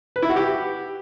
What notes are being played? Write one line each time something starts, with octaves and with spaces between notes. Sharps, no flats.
B4
E4
F#4
G4